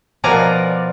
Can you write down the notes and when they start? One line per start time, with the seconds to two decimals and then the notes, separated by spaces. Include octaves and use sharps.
0.24 B2 F3 A#4 D5 G#5 A#5